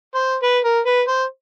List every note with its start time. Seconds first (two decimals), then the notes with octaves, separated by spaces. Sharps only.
0.15 C5
0.43 B4
0.65 A#4
0.86 B4
1.08 C5